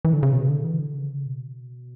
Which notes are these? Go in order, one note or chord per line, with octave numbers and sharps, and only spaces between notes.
E3
D3
C#3
B2
D3
E3
D3
C#3
B2